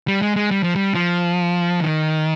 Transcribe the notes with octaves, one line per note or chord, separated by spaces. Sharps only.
G3
G#3
G#3
G3
F3
G3
F3
D#3